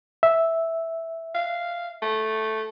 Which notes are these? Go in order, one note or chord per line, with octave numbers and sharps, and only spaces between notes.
E5
F5
A3